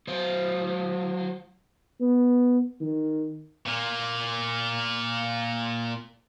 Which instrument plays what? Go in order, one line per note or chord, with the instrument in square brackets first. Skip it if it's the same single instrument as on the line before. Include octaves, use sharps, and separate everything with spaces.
[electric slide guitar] F#3 C5
[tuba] B3
D#3
[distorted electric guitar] A#2 A#3